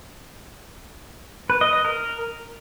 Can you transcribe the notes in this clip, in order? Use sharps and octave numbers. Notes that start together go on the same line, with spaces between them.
B4
D#5
D#5
A#4